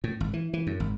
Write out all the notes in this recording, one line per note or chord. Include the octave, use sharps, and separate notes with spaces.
A2
G#1
E3
E3
F#2
G#1